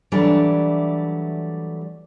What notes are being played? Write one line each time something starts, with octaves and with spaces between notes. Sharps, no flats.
E3 F#3 G3 A3 D4 D5